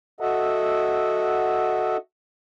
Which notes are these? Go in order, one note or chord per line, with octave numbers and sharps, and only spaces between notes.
F#4 A4 D#5 E5 F#5